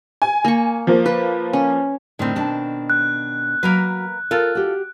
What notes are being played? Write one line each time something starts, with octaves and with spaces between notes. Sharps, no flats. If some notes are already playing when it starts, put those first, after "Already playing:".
G#5
A#3 C#6
F3 A#3
B4
C#4
A2 D3 D#3 C4
B2 D4 A5
F#6
F#3 A#3 A#4 B4
F4 A4 A#4
F#4 G4